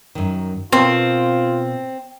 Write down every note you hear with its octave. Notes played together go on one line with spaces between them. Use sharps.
F#2 D#3
B2 C4 F4 A#4 A5